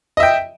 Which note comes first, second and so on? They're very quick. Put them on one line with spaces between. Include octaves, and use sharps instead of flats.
D#5 E5 G5